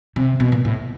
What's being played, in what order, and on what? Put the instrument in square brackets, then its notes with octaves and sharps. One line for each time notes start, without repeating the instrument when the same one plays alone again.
[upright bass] C3
B2
A#2
A2